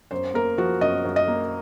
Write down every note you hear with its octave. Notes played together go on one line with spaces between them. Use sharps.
F#2 C5
A#3 A#4
F3 F#4
F#2 D#5
F#2
D#5
A#3